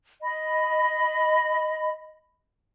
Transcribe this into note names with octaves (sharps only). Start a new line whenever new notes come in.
D#5 B5